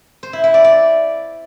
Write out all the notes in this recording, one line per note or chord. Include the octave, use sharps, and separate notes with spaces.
C5
E4
E4
D5
D5